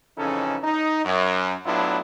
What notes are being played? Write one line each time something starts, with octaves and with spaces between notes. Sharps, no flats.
F2 C#3 E3 C#4 D#4 A4
D#4
F#2
A2 F#3 B3 D4 E4 F4